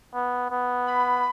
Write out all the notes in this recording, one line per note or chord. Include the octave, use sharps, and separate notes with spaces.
B3
B3
B5